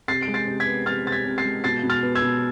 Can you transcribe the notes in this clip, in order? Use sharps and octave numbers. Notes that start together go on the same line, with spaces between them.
C3 A6 C7
D7
G#3
A6 C7
C3
G#6 B6
B3
C3 F6 A6
C3 A6
G#6 B6
C3
A6 C7
G#3
B2 A6 C7
B2
F6 A6
B3
E6 G#6
B2